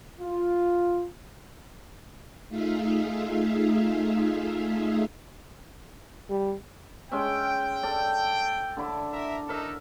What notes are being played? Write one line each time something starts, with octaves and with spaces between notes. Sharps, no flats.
F4
A3 D#4 F4 G#4 E5 F5
G3
G#3 C#4 E5 G5
A4 D5
D3 E4 D6
A#4 E5
D#4 A4 A#4 E5